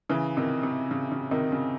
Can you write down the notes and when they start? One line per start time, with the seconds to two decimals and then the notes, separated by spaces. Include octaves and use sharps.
0.10 C#3 E3
0.37 C3 D#3
0.63 C3
0.91 C#3
1.12 C#3
1.31 C3 D#3
1.52 C#3